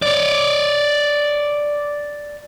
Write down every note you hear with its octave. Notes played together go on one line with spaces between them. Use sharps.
C#5 D5